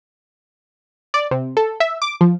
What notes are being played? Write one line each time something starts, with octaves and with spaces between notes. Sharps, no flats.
D5
C3
A4
E5
D6
F3